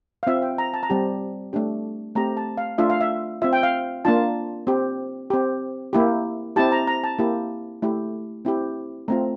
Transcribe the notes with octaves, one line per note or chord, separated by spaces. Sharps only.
F5
C4 F4 E5
G5
A#5
A5
A#5
G3 C4 G4 A5
A3 D4 G4
A3 C4 G4 A#5
A5
F5
A3 D4 F4 E5
F5
E5
C4 F4 E5
G5
F5
A#3 D4 F4 A5
C4 G4
C4 G4
A#3 E4 G4
C4 E4 G4 A5
A#5
A#5
A5
A#3 E4 G4
A3 E4 G4
C4 E4 G4
A3 C4 F4 A#5